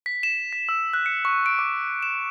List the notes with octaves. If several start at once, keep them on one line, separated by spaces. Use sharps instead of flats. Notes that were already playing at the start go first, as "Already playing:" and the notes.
B6
E7
B6
E6
F#6
C#7
C#6
D7
D6
E7